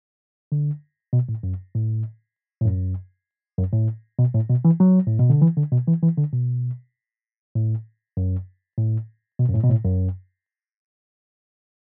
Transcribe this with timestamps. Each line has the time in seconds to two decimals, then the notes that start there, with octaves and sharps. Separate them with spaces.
0.52 D3
1.13 B2
1.29 A2
1.43 F#2
1.75 A2
2.62 A2
2.66 F#2
3.58 F#2
3.73 A2
4.19 B2
4.34 A2
4.49 B2
4.65 E3
4.80 F#3
5.07 A2
5.19 B2
5.30 D3
5.41 E3
5.57 D3
5.72 B2
5.87 E3
6.02 E3
6.18 D3
6.33 B2
7.55 A2
8.17 F#2
8.78 A2
9.39 B2
9.49 F#2
9.54 A2
9.63 B2
9.70 A2
9.85 F#2